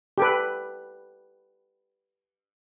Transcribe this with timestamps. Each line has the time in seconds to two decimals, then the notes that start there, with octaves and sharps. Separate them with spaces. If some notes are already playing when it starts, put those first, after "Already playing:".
0.18 G4 A4 B4